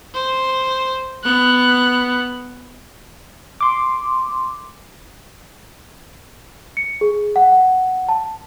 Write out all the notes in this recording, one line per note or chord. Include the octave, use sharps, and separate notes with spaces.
C5
B3 F#6
C6 D6
C#7
G#4
F#5
F#5
A5